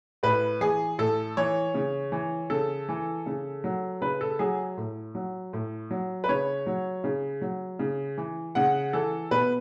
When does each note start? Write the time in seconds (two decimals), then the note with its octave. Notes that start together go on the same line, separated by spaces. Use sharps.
0.23 A2 B4
0.61 E3 G#4
0.98 A2 A4
1.37 E3 C#5
1.74 C#3
2.12 E3
2.50 C#3 A4
2.89 E3
3.26 C#3
3.64 F#3
4.01 C#3 B4
4.21 A4
4.39 F#3 G#4
4.77 A2
5.15 F#3
5.53 A2
5.91 F#3
6.24 B4
6.28 C#3 C#5
6.67 F#3
7.04 C#3
7.41 F#3
7.79 C#3
8.18 E3
8.55 C#3 F#5
8.93 E3 A4
9.31 B2 B4